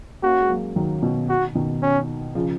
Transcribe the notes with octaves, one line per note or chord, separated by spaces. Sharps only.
A#3 C#4 F#4
G#3
F#3 A#3
D#3 F#3
B2 D#3
F#4
B2 D#3
C#4
C#3 F3